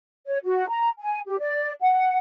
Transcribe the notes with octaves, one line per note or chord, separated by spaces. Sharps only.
C#5
F#4
A#5
G#5
G4
D5
F#5